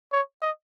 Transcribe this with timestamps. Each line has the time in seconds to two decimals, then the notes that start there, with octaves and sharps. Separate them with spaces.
0.12 C#5
0.42 D#5